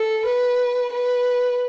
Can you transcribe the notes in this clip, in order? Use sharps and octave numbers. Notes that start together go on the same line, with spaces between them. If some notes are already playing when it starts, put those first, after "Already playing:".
Already playing: A4
B4
B4